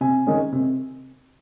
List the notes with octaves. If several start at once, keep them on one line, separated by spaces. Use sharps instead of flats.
C3 G#5
D#3 G#3 C#4
C3